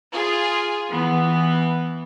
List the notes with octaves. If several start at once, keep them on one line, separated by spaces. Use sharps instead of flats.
F4 G#4
E3 B3